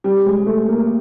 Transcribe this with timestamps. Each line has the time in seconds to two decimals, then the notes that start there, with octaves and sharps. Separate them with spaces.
0.04 G3
0.26 G#3
0.47 A3
0.68 A#3